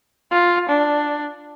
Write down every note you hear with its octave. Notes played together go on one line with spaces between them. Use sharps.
F4
D4